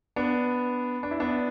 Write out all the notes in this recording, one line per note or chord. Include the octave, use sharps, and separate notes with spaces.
B3 D4
D4
E4
B3 D4